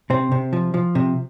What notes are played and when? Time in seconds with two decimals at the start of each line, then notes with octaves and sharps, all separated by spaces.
0.10 C3 C4
0.32 C3
0.53 F3
0.74 F3
0.95 C3